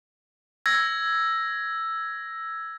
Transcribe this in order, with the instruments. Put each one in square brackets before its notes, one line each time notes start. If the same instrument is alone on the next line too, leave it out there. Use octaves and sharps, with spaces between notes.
[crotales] E6 G#6 A#6